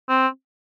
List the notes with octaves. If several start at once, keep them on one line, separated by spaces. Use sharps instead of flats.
C4